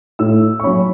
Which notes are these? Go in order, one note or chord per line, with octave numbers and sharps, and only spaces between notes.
A2 E6
C#6
F#3 C#4 B5